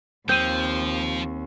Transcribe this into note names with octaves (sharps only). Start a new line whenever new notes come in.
D#2 F3 C4 G6 D#7